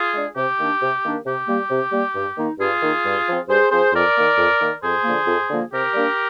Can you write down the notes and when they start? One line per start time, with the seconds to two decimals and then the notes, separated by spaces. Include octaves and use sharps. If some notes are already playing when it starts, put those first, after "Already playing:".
Already playing: F4 G#4
0.14 G#3 D4
0.36 C3 G4
0.58 D#3 A#3 D4
0.81 C3
1.04 D#3 A#3 D4
1.26 C3 G4
1.48 G3 A#3
1.70 C3
1.92 G3 A#3
2.15 G2
2.38 D#3 A#3 D#4
2.59 G2 F4 G#4
2.81 D#3 A#3 D#4
3.04 G2
3.26 F3 C4
3.48 G2 G#4 C5
3.70 F3 C4 G#4 C5
3.93 F2 A#4 D5
4.15 D#3 A#3
4.37 F2
4.60 D#3 A#3
4.83 F2 G#4 C5
5.04 D3 F3 A#3
5.26 F2
5.49 D3 F3 A#3
5.71 C3 G4 A#4
5.93 G3 A#3 D4